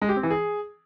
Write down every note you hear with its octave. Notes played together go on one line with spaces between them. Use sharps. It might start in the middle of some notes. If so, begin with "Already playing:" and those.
G#3
G4
C4
E3
G#4